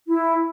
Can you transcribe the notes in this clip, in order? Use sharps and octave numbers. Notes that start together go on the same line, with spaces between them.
E4